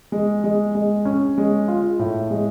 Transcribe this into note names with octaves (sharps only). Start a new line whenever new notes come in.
G#3
G#3
G#3
C#4
G#3
F4
A2
G#3